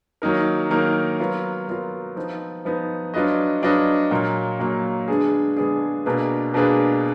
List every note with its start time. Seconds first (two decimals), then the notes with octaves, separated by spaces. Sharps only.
0.22 D#3 F#3 A#3 D#4 A#4
0.70 D#3 F#3 A#3 D#4 A#4
1.19 F#3 B3 F4 A#4
1.68 F#3 B3 F4 A#4
2.16 F3 B3 D#4
2.65 F3 B3 D#4
3.14 F#3 D4 F4 B4 D#5
3.62 F#3 D4 F4 B4 D#5
4.11 A#2 F#3 A#3
4.60 A#2 F#3 A#3
5.08 D3 G#3 B3 D4 G#4
5.57 D3 G#3 B3 D4 G#4
6.06 B2 A#3 D4 G#4 B4
6.54 B2 A#3 D4 G#4 B4